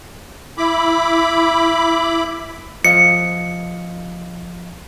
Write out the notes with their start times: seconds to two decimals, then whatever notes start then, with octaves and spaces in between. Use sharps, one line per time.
0.58 E4 B5 D6
2.85 F3 D#5 F5 C#7